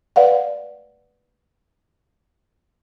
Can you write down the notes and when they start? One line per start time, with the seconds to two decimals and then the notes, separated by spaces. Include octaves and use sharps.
0.16 B4 D5 F5 F#5